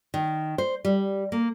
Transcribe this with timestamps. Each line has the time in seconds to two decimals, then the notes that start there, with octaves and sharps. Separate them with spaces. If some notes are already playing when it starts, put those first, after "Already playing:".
0.14 D#3
0.58 C5
0.85 G3
1.32 A#3